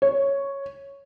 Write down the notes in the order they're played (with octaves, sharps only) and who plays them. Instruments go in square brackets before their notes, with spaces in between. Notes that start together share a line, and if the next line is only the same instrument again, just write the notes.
[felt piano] C#5